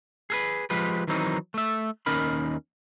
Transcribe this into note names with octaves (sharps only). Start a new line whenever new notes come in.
G#4 A4 B4
F3 G#3 G4 B4
D#3 E3 F#3 C4 C#4 D#4
A3 E5
D#2 C#4 D#4 A#4 B5